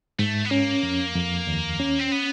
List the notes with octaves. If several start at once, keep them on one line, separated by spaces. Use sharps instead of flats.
G#2 A3
B3
A#3 C#4
F2
F2
D#2
C#4
C4
B3